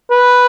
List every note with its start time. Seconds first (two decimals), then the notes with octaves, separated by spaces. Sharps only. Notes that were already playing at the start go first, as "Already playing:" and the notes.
0.11 B4